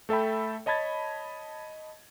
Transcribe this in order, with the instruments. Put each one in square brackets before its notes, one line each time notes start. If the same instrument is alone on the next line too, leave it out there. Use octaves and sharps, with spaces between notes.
[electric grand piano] A3 A4 E5 G5 B5
C#5 D#5 A5 B5 G#6 A6